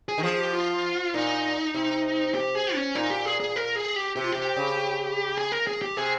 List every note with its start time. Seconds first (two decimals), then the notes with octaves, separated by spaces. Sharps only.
0.08 G#4
0.18 D#3
0.23 F3 G#4
0.38 G4
0.53 F4
1.14 A#2 D#4
1.74 C3
2.35 G4
2.55 G#4
2.75 C#4
2.95 A#2 D#4
3.10 G4
3.26 G#4
3.40 G#4
3.56 A#4
3.76 G#4
3.96 G4
4.16 C3 G4
4.24 F4
4.32 C3 G4
4.57 C#3
5.38 G#4
5.52 A#4
5.67 G#4
5.82 G4
5.97 C3 G#4